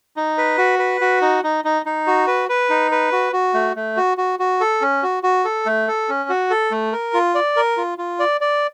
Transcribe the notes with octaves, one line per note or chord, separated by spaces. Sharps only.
D#4
B4
F#4
B4
F#4
D#4
D#4
D#4
D#4
F#4
B4
B4
D#4
B4
F#4
F#4
A3
A3
F#4
F#4
F#4
A4
C#4
F#4
F#4
A4
A3
A4
C#4
F#4
A4
A3
A#4
F4
D5
A#4
F4
F4
D5
D5